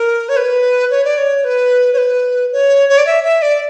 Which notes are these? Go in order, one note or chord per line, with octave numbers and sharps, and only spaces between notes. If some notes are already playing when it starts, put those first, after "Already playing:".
Already playing: A#4
C#5
B4
C#5
D5
C#5
B4
C#5
B4
C#5
C#5
D5
E5
E5
D5